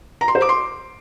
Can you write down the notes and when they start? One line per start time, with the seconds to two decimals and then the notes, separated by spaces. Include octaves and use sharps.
0.21 A#5
0.28 C6
0.35 C5
0.42 D6
0.49 C6